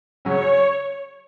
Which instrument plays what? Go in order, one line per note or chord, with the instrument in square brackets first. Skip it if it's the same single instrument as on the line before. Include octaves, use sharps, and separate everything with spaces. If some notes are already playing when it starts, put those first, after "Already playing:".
[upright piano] C#3 F#3 C#4 F#4 [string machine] C#5